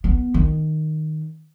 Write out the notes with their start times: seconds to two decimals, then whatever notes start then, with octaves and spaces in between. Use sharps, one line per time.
0.04 B3
0.34 D#3